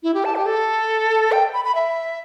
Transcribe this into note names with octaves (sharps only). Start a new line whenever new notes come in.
E4
G4
A5
G4
A4
G5
B5
B5
E5